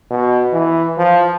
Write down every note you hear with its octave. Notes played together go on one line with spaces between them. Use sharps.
B2
E3
F3